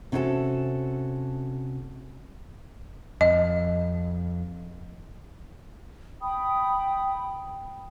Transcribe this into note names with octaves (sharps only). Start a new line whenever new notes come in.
C3 C#4 D#4 F#4 A4 A5
F2 D#5
G5 B5 D#6